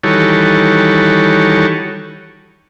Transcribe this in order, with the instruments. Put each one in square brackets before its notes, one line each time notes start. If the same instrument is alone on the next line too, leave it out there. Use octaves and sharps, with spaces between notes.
[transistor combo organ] D#3 E3 G3 F#4 A4 C#5